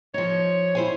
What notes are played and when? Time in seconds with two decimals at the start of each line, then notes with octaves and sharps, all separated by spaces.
0.14 F3 D#4 C#5
0.75 E4 C5 G#5